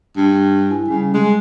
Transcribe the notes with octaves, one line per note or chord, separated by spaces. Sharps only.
G2
E4 G#5
C#3 G3
G#3